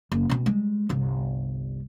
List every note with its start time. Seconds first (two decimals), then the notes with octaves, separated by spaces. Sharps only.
0.12 F#1
0.30 B2 C4
0.46 G3 G#3
0.89 G1 C2